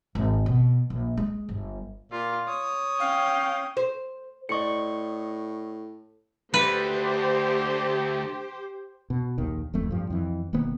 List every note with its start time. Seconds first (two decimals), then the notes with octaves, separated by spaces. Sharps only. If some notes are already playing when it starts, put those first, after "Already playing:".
0.15 G#1
0.46 B2
0.90 A#1
1.17 G#3
1.49 G1
2.12 A#2 F4
2.48 C#5 D#6
3.00 C#4 F5 G5
3.77 C5
4.49 A2 C5 D5 D#5 C#6 C#7
6.54 D3 A3 G4 B4 C5
9.10 B2
9.38 A#1 D#2 D#3
9.73 D1 F2 A3
9.91 G2 F3
10.10 F2 E3
10.53 E1 D#3 A#3 B3